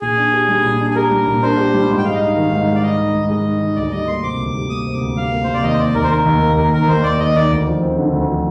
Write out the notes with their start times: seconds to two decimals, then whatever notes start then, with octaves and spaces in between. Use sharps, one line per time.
0.01 A#2 G#4
0.17 D4
0.33 G4
0.48 G3
0.65 A#2
0.80 D4
0.90 G#4
0.95 G4 A#4
1.11 G3
1.27 A#2
1.43 D4 C5
1.58 G4
1.74 G3
1.89 G#2
1.98 G5
2.05 G#3 F5
2.14 D#5
2.20 D#4 F5
2.36 D#3
2.52 G#2
2.67 G#3
2.75 D5
2.82 D#4 D#5
2.99 D#3
3.14 G#2
3.29 G#3 D#5
3.44 D#4
3.61 D#3
3.76 D2 D5
3.92 G3 D#5
4.07 A#3 C6
4.23 C3 D6
4.39 D2
4.54 G3
4.70 A#3 D#6
4.86 C3
4.93 D6
5.01 D2
5.16 G3 F5
5.32 A#3
5.44 C3 C5
5.54 D5
5.63 D#2 D#5
5.73 C5
5.79 A#3 D5
5.95 D#2 A#4
6.04 C5
6.10 D#3 A#4
6.26 D#2
6.42 A#3
6.57 D#2 A#4
6.72 D#3 A#4
6.88 D#2 C5
7.03 A#3 D5
7.20 D#2 D#5
7.35 D#3 D5
7.51 D2
7.67 F3
7.82 C4
7.97 D3
8.13 D2
8.29 F3